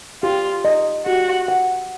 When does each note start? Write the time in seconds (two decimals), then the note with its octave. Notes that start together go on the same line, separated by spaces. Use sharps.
0.23 F4 G4
0.65 D#5
1.06 F#4 G4
1.48 F#5